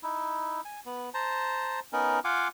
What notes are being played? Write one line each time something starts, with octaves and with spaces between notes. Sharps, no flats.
D#4 E4
G#5
B3
C5 A5 A#5
B3 C#4 D#4 A#4
F4 F5 F#5 G#5 D6